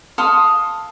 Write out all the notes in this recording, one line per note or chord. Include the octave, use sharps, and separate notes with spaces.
A4 F5 C6 D#6